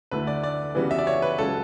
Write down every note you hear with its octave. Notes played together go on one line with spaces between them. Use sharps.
D2 D3 A3 E4 B4
D5
D5
C#3 E3 G3 B3 F#4
E5
D5
C#5
B4
C#2 C#3 F#3 A4